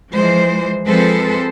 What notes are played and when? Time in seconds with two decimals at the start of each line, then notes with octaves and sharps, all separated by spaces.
0.12 E3 F3 G#3 C5
0.86 F3 G#3 C4 A4 B4 C5